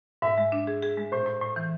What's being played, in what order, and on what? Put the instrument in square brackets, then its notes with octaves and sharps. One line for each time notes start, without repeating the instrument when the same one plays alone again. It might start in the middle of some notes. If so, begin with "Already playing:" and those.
[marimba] G#2 [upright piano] E5
[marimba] G#3
D4
G#4
G#4
G#3
[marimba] A2 [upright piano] C5
[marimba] A2
A2
E3